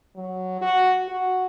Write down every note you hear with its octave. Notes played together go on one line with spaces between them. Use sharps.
F#3
F#4
F#4